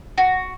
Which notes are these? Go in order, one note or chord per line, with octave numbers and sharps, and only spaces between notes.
F#4